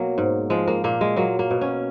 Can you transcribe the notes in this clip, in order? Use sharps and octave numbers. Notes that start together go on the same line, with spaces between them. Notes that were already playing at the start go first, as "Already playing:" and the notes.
Already playing: B2 F#3 A#3
G#2
F3 G#3
A#3
A#2 A#3
G#3
F#3 A#3
A#3
B2
C#4